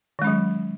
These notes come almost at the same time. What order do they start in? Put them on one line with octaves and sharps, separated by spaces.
D#3 G#3 C#4 F#3